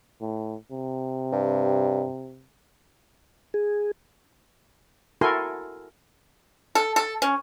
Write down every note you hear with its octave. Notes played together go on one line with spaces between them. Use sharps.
A2
C3
G2
G#4
E4 F#4 A4 A#4 G#5 C6
A4
A4
C#4